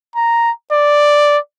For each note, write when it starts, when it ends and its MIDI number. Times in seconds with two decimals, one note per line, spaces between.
0.16 0.50 82
0.72 1.38 74